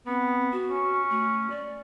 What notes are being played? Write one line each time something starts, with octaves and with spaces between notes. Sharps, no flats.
B3 C4
F#4
C#4
A3
D5